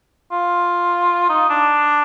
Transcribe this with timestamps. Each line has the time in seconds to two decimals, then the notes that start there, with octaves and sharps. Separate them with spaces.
0.32 F4
1.29 D#4
1.49 D4